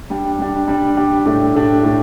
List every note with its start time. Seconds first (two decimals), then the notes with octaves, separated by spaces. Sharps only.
0.10 G3 D4 G4
0.39 G3 D4 G4
0.68 G3 D4 G4
0.97 G3 D4 G4
1.25 A2 A3 D4 G4
1.54 A2 A3 D4 G4
1.83 A2 A3 D4 G4